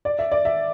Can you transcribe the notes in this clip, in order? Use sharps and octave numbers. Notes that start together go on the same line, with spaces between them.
D5
E5
D5
E5